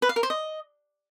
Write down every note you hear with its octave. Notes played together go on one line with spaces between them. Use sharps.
B4
F5
A#4
C5
D#5